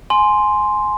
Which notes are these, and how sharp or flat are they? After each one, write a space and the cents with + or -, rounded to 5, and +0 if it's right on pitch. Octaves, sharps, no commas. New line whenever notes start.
G#5 +15 C6 +0